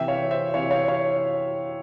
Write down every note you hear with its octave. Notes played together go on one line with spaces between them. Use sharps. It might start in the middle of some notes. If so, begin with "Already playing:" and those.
Already playing: C3 E3 E5 G5
C#5 F5
C5 E5
C3 E3 C#5 F5
C#5 F5
C#5 F5